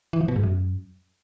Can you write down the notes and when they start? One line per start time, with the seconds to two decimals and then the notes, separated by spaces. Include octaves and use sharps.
0.13 E3
0.21 F3
0.28 B2
0.36 G#2
0.43 F#2